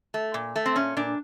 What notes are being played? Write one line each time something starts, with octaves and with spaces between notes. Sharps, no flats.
A3
A#2
A3
C4
A#2 C#4
A#2 D4